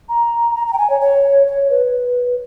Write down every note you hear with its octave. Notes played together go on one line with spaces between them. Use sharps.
A#5
A#5
A#5
G5
G#5
C#5
C#5
C#5
B4